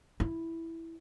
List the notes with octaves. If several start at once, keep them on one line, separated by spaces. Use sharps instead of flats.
E4